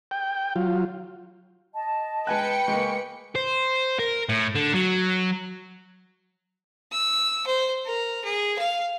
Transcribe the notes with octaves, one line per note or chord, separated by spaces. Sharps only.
G5
F#3 F4
D#5 A5
G#3 B4 G5 G#5 F#6 C#7
G#3 A#3 G#5 C#6
C5
A#4
A2
D3
F#3
E6
C5
A#4
G#4
F5